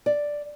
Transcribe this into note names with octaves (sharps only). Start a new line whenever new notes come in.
D5